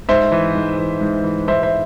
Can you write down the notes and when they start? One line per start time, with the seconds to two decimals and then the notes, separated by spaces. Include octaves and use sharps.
0.09 G#2 C5 E5
0.32 E3
0.55 G#2
0.78 E3
1.01 G#2
1.24 E3
1.48 G#2 C5 E5
1.63 C5 E5